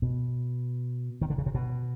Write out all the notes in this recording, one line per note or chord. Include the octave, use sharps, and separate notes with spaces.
B2
D#3
D3
C#3
C3
B2